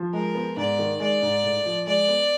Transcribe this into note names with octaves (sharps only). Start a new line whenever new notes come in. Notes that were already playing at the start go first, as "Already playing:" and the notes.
Already playing: F3
G#3 A#4
B3
G#2 D5
D#3
G#3 D5
G#2
A2
F3
G#3 D5
B3